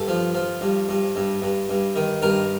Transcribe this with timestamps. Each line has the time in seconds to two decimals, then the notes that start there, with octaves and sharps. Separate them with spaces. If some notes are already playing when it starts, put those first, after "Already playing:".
Already playing: G2 A4
0.08 F3
0.35 F3
0.61 G2
0.89 G2
1.16 G2
1.42 G2
1.69 G2
1.96 D#3
2.22 G2 A#4